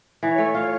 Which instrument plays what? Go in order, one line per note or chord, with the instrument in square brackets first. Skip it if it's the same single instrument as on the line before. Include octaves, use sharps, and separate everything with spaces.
[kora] E3 [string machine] C#5
[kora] A3
F4